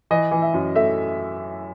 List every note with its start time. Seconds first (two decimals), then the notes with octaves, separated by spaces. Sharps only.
0.11 E3 D#5
0.31 E3
0.42 E5
0.54 F#2
0.76 A3 E5